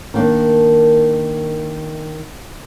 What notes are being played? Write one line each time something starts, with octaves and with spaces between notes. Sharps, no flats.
D#3 A#3 D4